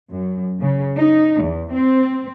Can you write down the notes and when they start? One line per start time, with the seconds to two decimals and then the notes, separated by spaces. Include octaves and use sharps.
0.11 F#2
0.59 C#3
0.97 D#4
1.41 E2
1.72 C4